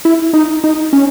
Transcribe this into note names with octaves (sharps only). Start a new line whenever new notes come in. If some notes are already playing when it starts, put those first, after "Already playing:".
E4
D#4
D#4
C#4